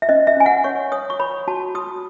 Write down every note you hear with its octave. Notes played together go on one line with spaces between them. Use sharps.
E5
C#4 D#5
E5
C#4 G#5
F#5
C#5 C#6
C#5 D#6
C#6
C#5 B5
F#4 A5
F#4 D#6